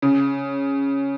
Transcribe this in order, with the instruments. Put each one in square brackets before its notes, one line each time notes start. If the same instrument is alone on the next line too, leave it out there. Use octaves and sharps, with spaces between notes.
[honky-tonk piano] C#3